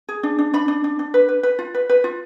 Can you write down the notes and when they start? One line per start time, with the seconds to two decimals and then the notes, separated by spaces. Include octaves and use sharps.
0.09 G#4
0.23 D4
0.39 D4
0.53 D4 B5
0.68 D4
0.84 D4
0.99 D4
1.14 B4
1.29 B4
1.43 B4
1.59 F4
1.75 B4
1.90 B4
2.04 F4